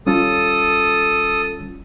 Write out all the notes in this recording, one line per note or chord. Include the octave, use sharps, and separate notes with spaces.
G3 C#4 F4 A4 D#6